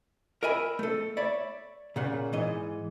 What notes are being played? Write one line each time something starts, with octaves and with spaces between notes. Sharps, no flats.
A#4 D#5 E5 G#5 B5
A3 A4
C#5 D5 E5 B5
A#2 C#3 F#5
G#2 E3 D#5